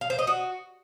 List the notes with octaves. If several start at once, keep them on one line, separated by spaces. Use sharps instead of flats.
F5
C5
D#5
F#4